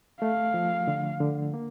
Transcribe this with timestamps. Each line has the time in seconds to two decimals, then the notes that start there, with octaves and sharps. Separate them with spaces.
0.21 A3 F5
0.54 F3
0.87 D3
1.20 D3
1.54 A#3